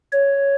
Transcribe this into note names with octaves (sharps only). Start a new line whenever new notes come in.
C#5